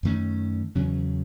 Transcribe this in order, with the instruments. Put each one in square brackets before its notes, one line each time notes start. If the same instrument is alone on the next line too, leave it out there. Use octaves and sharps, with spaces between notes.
[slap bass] F#2 D#3 A3 C#4
E2 C#3 F#3 C#4